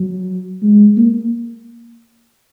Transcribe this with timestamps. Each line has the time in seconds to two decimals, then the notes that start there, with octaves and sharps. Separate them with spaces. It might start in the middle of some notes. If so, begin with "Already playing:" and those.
Already playing: F#3
0.62 G#3
0.97 A#3